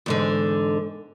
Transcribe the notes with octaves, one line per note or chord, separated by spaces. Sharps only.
E2 G#2 D3